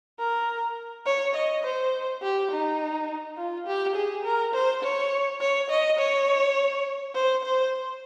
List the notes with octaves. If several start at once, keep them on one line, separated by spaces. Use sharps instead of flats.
A#4
C#5
D#5
C5
G4
D#4
F4
G4
G#4
A#4
C5
C#5
C#5
D#5
C#5
C5
C5